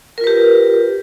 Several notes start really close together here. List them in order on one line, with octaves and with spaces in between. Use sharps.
A#4 F4 B4 G4